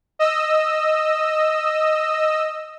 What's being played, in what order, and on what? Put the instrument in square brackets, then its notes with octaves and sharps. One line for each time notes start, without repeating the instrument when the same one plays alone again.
[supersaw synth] D#5 E6